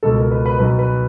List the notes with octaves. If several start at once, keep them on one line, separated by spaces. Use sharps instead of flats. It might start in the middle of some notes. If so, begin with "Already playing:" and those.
C#2 B2 A4
A#4
B4
B4
B1 B2 B4
B4